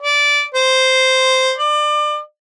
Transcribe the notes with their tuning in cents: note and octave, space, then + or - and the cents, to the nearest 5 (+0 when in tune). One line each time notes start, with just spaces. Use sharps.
D5 -15
C5 -5
D5 +30